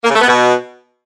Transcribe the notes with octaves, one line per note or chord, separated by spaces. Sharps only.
A#3
C#3
A3
B3
B2